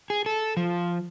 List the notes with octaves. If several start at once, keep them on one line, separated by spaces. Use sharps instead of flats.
G#4
A4
F3